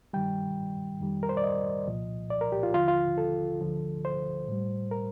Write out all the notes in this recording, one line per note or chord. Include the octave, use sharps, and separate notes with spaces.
G2 D#3 G3 G5
F2 D#3 G3
A#4
C5
D5
D#5
C2 A#2 F3
D5
A#4
G4
F4
D#2 D3 F3 F4
F4
A4
D2 D3 F3
C5
A2 G3
A#4